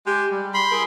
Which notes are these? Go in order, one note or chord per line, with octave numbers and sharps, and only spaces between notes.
G#3 G4
G3
B5 C6
E4 G#4 A#4